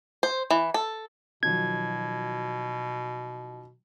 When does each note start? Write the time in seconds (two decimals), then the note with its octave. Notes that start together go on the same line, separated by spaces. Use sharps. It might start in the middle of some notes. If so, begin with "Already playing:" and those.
0.23 C5
0.50 E3
0.74 A4
1.43 B2 D#3 F3 F#3 G#6